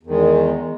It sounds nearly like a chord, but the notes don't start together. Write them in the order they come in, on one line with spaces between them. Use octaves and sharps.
E2 D#3 G#3